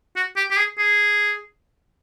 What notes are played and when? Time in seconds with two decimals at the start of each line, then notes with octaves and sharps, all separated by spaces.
0.16 F#4
0.36 G4
0.51 G4
0.57 G#4
0.78 G#4